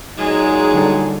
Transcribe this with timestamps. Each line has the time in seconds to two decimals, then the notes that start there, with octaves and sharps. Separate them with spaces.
0.17 A#2 F#3 G#3 D#4 G#4
0.74 D3 G3 A4